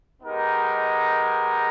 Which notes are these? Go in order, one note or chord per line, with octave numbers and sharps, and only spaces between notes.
G#3 B3 D#4 G4 A#4